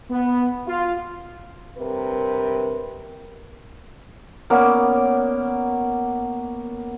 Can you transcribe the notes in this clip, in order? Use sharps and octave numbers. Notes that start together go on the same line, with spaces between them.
B3
F4
G2 C3 C4 A#4 B4
A#3 B3 C#4 D5